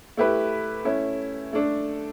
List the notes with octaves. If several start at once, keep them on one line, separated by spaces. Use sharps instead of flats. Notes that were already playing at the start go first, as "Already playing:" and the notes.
A3 E4 G4 B4
A3 C#4 E4
A3 D4 A4